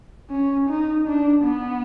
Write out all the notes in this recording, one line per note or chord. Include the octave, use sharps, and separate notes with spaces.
C#4
D#4
D4
B3